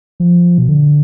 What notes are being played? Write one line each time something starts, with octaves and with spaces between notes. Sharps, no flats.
F3
B2
D3